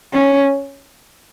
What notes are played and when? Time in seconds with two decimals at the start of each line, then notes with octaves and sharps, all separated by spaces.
0.14 C#4